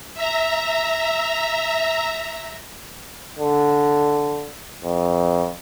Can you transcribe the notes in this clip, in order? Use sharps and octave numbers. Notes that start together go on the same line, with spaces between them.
E5 A#5
D3
F2